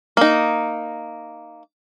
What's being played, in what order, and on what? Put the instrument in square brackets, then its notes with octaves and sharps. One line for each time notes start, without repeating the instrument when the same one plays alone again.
[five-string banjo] A#3 D#4